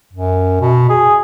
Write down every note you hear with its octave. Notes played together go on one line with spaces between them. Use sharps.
F#2
B2
G#4